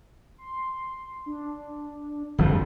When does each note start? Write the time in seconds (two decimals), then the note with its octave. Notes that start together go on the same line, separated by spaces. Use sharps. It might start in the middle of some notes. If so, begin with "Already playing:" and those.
0.38 C6
1.26 D4
2.38 G1 F2 F3